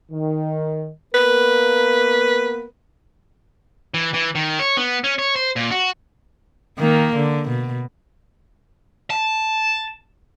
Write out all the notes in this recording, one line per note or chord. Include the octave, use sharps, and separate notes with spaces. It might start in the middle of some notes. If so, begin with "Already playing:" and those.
D#3
A#3 B3 A#4 B4
E3
E3
D#3
C#5
B3
C#4
C#5
C5
A#2
F#4
D#3 A#3
D3
B2
A5